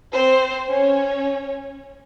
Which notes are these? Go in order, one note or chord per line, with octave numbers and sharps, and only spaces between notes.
C4 C5
C#4 C#5